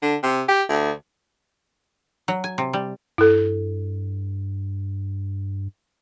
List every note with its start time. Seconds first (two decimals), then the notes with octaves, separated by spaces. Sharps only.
0.02 D3
0.23 C3
0.48 G4
0.69 D2
2.28 F#3
2.44 G#5
2.58 C3
2.73 G3
3.18 G2 E4 A4